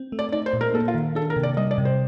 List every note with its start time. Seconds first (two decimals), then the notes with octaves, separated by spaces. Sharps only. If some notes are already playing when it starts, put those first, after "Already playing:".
Already playing: C4
0.12 A3
0.19 D5
0.32 D#4 D5
0.46 C5
0.53 A#2
0.61 A#4
0.74 A#3 A4
0.88 F4
0.95 D#3
1.15 D4 A4
1.30 A#4
1.36 C3
1.43 D5
1.57 G3 D#5
1.71 D5
1.78 C3
1.85 C5